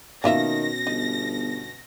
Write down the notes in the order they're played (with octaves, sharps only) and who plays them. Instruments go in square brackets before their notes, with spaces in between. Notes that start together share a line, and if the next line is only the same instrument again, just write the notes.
[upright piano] B2 C#4 [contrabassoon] D#3 [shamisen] A#3 F4 E5 [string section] A#6
[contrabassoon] G1 [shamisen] D#4